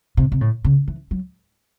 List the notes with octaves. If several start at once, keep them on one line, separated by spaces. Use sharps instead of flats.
C3
C3
A2
C#3
E3
F#3